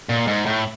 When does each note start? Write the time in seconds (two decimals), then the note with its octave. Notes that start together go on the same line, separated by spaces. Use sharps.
0.09 A#2
0.27 G#2
0.46 A2